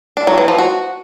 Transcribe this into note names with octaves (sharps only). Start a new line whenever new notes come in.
D4
F#3
E3
F3
F#4